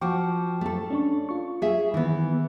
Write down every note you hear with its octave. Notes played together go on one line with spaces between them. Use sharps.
F3 F#4 G5 C#6 D6
A3 A4
C#4 D4 C#6
F4 C#6
G#4 E5
D#3 E3 B3